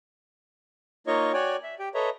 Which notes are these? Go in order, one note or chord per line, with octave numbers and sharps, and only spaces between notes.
A#3 D#4 F4 C#5 D#5 C#6
F#4 C#5 D5 G5 G#5
E5
G4 G5
A4 B4 C#5 D#5 E5 A#5